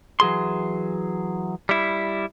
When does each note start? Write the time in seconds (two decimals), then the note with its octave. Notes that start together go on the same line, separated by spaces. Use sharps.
0.20 E3 F#3 G#4 C6
1.69 G3 E4